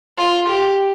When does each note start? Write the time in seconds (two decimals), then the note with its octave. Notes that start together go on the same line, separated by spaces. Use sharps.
0.18 F4
0.49 G4